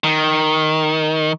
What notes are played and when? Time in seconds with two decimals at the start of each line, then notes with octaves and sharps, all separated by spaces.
0.04 D#3